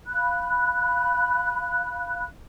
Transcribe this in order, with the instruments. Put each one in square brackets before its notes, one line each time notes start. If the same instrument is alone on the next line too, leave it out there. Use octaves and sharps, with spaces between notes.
[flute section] F5 B5 F#6